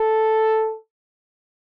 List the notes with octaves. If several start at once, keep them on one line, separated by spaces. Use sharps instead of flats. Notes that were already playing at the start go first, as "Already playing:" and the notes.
Already playing: A4